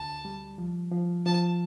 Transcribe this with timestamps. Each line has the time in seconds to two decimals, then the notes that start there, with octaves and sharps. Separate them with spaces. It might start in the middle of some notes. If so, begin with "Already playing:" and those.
Already playing: D2 A5
0.25 G3
0.58 F3
0.92 F3
1.26 F3 A5